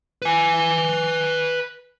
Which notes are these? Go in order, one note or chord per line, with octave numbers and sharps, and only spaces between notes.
B4 G#5